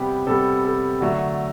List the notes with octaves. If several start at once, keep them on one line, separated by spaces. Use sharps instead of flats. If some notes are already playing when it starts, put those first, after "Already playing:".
Already playing: C3 G3 B3 G4
C3 G3 B3 A4
A4
D3 F#3 A3